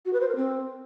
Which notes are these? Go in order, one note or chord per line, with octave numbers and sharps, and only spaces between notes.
F#4
B4
C5
A#4
C4